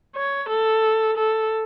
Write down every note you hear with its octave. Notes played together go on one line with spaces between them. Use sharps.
C#5
A4
A4